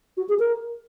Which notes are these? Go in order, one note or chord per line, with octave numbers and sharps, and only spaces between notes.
F#4
G#4
A#4